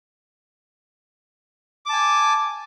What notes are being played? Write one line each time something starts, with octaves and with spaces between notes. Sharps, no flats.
G#5 A5 D6